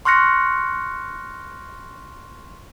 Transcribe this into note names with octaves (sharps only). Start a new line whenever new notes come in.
C6 C#6 F6 F#6 A#6 C#7